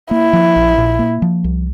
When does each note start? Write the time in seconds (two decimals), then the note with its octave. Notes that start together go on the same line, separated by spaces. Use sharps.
0.11 A#3 E4
0.33 F3
0.56 A#1
0.78 A#2
0.99 A#3
1.22 F3
1.44 C2